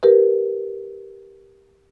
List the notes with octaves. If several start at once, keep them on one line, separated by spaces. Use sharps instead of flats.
G4 A#4 B4